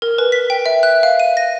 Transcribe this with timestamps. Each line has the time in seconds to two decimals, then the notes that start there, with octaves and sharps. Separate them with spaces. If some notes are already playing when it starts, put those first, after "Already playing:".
0.02 A#4
0.18 B4
0.32 B6
0.50 G5
0.66 E5
0.83 F#6
1.03 F5
1.20 D#7
1.37 A#6